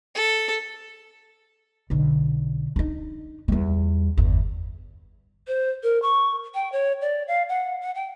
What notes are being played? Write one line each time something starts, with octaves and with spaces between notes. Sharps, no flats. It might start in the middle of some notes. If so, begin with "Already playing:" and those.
A4
B1 D3
D4 D#4
E2 G3
G1 E2
C5
A#4
C#6
G5
C#5
D5
F5
F#5
F#5
G5